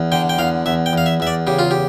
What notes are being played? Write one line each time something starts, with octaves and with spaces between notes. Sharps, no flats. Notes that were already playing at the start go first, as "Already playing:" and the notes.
Already playing: E2
D3 G5
G5
E2 F5
E2 E5
G5
E2 F5
E5
E2 E5
D5
C#3 G4
F4
G4